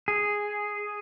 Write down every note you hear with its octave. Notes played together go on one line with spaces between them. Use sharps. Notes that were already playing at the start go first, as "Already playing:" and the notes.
G#4